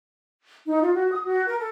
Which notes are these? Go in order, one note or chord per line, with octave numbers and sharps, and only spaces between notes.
D#4
F4
F#4
D#6
F#4
A#4
A4